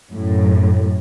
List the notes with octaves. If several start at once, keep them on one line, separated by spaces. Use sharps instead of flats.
F#2 A2